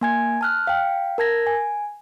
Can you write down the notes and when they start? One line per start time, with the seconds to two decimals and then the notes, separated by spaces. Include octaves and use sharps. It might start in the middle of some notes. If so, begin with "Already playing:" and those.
0.01 A#3 G#5 G#6
0.41 A5 F6 F#6
0.67 F5 G5
1.18 A#4 A5 G#6 A#6
1.47 G#5